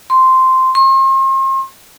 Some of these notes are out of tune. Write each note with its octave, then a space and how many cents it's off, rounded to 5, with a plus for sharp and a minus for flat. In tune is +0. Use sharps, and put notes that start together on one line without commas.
C6 -5
C6 +40